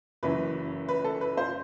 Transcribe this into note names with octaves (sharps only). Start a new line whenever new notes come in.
F#1 F#2 E3 B4
B4
A4
B4
C5